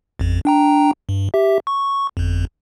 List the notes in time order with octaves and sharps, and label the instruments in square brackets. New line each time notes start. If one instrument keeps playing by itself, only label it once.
[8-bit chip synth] A1 F2
D4 G5 A#5
G2
G4 E5
C#6
G1 F2